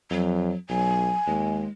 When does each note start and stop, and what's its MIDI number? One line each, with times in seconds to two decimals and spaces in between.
0.11 0.52 41
0.11 0.56 54
0.69 1.10 35
0.69 1.15 54
0.69 1.54 80
1.27 1.65 39
1.27 1.69 56